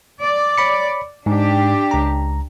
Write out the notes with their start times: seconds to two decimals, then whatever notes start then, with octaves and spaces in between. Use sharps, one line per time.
0.22 D5
0.58 C#5 B5 C#7
1.26 G#2 D4 G4
1.91 C#2 A#5